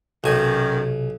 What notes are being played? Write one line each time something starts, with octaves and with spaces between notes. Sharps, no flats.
B1 F#2 C3 D#3 G#5